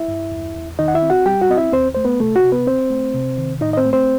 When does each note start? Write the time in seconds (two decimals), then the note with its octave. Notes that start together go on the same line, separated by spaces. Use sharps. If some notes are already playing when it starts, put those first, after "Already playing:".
Already playing: E4 E5
0.08 G2
0.32 E2
0.56 E2
0.79 D#3 D#4 D#5
0.88 F#5
0.95 E4 E5
1.02 C4
1.10 F#4 F#5
1.25 G3 G4 G5
1.41 F#4 F#5
1.50 C4 D#5
1.57 E4 E5
1.73 D#2 C4 C5
1.95 A3 C5
2.05 B3 B4
2.20 C3 A3 A4
2.36 F#4
2.44 C3
2.52 B3 B4
2.67 C4 C5
2.90 A3
3.14 C3
3.38 D#3
3.61 A2 D#4 D#5
3.73 D#5
3.77 C4 C5
3.85 A3
3.93 C4 C5